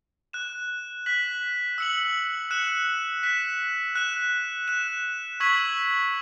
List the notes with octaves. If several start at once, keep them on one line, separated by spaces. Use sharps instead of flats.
F#6 E7
F#6 B6 F#7
E6 C#7 F#7
F#6 C#7 E7
F#6 B6 E7
F#6 E7
F#6 E7
C#6 E6 G#6 B6 F#7